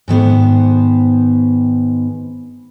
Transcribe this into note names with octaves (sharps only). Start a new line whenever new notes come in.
G#2 D#3 B3 C5